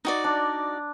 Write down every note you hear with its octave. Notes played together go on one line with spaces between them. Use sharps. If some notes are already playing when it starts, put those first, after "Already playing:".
D#4 F#4 D5
D4